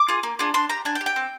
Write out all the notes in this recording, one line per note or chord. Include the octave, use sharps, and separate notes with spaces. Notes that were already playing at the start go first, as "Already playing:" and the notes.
Already playing: D6
F4 G#4
A#3
D4 F4 G#4
D4 C6
G4 A#5
D4 G#5
G5
G4
G5
C4